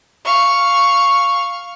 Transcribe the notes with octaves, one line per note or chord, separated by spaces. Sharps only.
F5 C#6